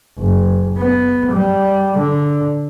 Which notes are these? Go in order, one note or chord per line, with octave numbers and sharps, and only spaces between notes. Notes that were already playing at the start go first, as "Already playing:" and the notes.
F#1
B3
G3
D3